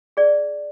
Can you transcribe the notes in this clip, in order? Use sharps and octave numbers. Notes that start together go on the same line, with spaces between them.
G#4 D5